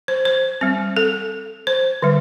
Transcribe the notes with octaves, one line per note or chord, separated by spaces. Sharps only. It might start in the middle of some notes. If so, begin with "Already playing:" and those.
C5
C5
G3 C4
A4
C5
D3 G3